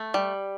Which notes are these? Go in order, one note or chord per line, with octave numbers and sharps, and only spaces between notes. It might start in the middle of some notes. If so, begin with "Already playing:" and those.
Already playing: A3
G3